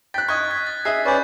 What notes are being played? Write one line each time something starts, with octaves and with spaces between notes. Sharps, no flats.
G5 F#6 A6 B6
D#5 C#6 F6 F#6 G#6
G#6 B6
A6
G#4 D#5 E5 C7
C#4 B4 D5 C#6 G6